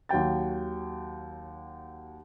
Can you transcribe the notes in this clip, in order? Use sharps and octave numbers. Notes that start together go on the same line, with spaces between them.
D#2 F#3 F#4 G5 A6